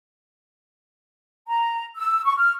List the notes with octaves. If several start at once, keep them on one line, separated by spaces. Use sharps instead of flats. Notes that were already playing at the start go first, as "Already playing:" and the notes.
A#5
E6
C#6
F6